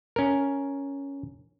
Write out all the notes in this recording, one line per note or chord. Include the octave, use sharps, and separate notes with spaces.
C#4 A#4